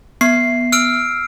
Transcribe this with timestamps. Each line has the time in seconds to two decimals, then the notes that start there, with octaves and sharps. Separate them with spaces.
0.21 B3 C7
0.72 E6 F6 D7